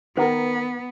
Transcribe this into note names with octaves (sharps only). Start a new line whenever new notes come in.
D#3 B3 A#4 B4 F#5 A#5